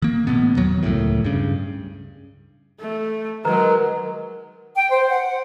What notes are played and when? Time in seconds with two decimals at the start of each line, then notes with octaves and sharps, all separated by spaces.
0.02 D#3 A#3
0.27 A1 B2 B3
0.57 E2 D#3 F#3
0.83 D1 C#2 F#2 A2
1.25 G2 C#3
2.79 A3
3.45 D#3 F#3 G#3 A#4 B4 A#5
4.75 G5
4.91 C5
5.09 F#5